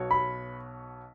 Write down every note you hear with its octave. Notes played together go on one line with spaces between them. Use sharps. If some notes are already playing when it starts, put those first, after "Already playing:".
Already playing: B1 B2 B3 F#4 C#5
B5